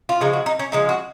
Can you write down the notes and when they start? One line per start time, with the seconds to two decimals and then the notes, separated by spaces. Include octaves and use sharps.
0.09 F4
0.21 C#3 F3 G#3 D#4
0.33 F#4
0.46 D#4
0.59 C#4
0.72 C#3 F3 G#3 D#4
0.89 F#4